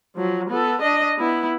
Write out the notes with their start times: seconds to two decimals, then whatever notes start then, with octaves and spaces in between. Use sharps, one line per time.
0.15 F3 F#3
0.50 B3 A4
0.81 D4 D#5
1.18 B3 E4